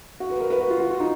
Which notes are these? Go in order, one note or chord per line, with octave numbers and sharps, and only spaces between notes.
F#4
B4
A#4
B4
F#4
F4
F#4
F4
D#4